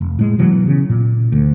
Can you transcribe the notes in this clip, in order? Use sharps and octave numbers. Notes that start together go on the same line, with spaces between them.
F1
A2 G#3
B2 E3 F#3
C#3
A#2
D2